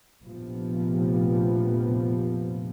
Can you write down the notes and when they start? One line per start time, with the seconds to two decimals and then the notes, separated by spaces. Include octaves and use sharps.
0.22 F1 A#1 C3 F3 B3